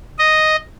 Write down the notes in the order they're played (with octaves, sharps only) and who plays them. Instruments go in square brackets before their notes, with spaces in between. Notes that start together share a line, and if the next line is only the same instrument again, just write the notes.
[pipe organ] D#5